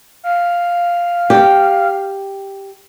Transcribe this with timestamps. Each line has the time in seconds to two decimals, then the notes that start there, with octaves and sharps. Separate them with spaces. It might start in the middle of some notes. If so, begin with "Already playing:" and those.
0.24 F5
1.30 G4